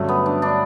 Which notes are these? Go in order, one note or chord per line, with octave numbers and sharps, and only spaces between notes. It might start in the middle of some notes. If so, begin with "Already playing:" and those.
Already playing: G2 D3 F#3 A3 C#4
B3
D4
D4